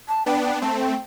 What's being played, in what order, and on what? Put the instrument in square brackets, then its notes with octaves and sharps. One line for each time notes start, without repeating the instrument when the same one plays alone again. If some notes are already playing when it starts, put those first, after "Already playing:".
[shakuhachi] A5
[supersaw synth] B3 D4 [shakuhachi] G5
[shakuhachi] G5
[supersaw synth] A3 C4 [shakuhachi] A5
[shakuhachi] G5